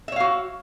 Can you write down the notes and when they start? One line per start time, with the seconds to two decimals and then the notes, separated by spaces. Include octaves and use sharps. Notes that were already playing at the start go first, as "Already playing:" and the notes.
0.08 E5
0.12 C#5
0.16 F5
0.20 F#4